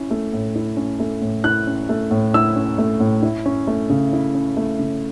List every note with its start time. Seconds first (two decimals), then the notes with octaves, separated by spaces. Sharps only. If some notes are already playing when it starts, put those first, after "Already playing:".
Already playing: C#4 E4
0.10 A3
0.33 A2
0.56 E4
0.77 C#4
0.99 A3
1.21 A2
1.44 E4 F#6
1.67 C#4
1.89 A3
2.11 A2
2.34 E4 E6
2.56 C#4
2.78 A3
3.00 A2
3.23 E4
3.46 C#4
3.67 A3
3.90 C#3
4.13 E4
4.35 C#4
4.57 A3
4.79 C#3